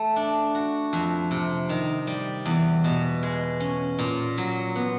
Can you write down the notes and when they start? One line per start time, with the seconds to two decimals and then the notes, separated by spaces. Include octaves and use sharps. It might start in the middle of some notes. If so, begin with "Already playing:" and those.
Already playing: A3
0.16 D4
0.55 F#4
0.93 F2
1.31 C3
1.69 D#3
2.07 G3
2.45 E2
2.84 B2
3.23 G#3
3.60 C#4
3.99 A#2
4.38 F#3
4.75 B3